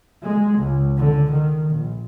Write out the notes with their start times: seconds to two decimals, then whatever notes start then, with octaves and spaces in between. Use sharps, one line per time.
0.24 G#3
0.59 C#2
0.97 D3
1.32 D#3
1.70 A#1